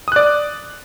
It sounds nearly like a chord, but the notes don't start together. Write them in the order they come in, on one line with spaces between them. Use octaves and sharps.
D#6 F#6 D5